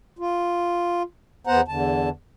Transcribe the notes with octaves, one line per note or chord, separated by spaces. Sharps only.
F4
E2 B3 C5 F#5 A#5
E2 D3 A5